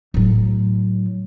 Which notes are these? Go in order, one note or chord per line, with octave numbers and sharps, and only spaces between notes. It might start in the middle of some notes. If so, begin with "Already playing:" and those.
A2 F#3